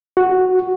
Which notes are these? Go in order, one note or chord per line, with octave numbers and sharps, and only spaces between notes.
F#4